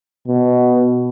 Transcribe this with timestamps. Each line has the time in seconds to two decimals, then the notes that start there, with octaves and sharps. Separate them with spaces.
0.27 B2